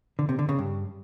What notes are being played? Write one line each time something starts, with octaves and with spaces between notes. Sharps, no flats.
D3
C3
D3
C#3
G2